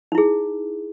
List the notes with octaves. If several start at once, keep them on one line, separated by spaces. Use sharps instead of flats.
D#4 E4 G#4